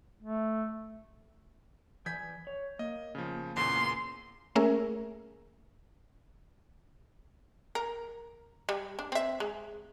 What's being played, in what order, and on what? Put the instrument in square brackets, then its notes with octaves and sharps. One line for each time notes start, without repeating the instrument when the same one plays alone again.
[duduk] A3
[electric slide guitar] E3 D5 G#5 [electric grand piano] G6 G#6 B6
[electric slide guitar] C#5
[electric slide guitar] A#3 [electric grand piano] D#5
[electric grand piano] C#3 F3
[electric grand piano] E2 A#2 C#3 [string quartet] C6
[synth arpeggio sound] A3 A#3 C#4 G#4 A#4 E5
[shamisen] A#4
G3
D4
C4 E5
G#3